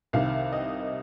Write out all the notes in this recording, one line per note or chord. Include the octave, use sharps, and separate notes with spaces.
C2 C3 D#3 F5
D#5